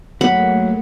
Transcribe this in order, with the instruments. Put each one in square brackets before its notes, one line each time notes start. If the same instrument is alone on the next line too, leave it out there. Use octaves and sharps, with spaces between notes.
[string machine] G#2 A3 A#3 [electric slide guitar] F#3 [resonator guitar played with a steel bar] F#5 [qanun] B5